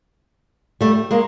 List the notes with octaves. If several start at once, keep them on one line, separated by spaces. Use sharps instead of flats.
G3 A3
G#3 A#3